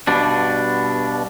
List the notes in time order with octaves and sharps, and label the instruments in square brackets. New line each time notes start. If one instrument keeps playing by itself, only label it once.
[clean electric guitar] G2 B2 D4